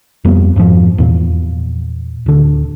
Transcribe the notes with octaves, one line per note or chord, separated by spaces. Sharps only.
F2 G3 A#3 B3
F2 G#2 B2 F3
E2 A#2
D1 D3